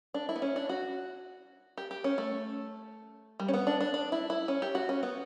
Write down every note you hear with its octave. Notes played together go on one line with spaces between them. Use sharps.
D4
E4
B3
C#4
D4
F#4
G4
G4
C#4
A3
G3
C#4
B3
D4
D4
D4
E4
E4
C#4
G4
F#4
C#4
B3